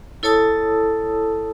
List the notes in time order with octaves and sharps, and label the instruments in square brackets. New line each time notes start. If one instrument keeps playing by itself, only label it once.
[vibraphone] E4 A4 C#5 A5 D#6 E6